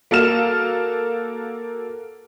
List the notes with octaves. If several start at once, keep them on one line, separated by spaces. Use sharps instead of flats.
A#3 F#4 A4 F5 F6 E7